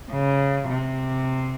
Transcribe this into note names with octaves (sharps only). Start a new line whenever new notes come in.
C#3
C3